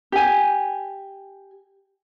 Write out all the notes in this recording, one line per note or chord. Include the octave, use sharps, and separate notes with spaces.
G4 G#5